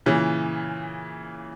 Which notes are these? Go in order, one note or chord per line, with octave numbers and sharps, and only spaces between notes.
A#2 C#3 E3